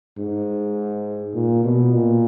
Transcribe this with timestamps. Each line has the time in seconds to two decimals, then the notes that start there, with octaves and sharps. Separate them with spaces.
0.18 G#2
1.34 A#2
1.64 B2
1.94 A#2